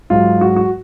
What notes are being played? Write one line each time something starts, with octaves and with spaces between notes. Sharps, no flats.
G#2 F#3 F4
F#4
F#4